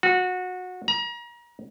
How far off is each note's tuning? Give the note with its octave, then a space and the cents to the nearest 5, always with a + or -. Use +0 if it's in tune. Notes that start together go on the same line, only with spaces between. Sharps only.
F#4 -20
A#5 +35